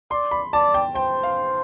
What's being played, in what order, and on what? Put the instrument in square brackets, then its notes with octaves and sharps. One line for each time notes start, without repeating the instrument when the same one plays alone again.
[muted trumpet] D5 [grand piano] C6
[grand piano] B5
[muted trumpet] D5 [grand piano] A5
[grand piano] G5
[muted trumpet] C5 [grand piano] G5
[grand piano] F5